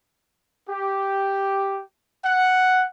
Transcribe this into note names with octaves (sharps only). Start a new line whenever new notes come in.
G4
F#5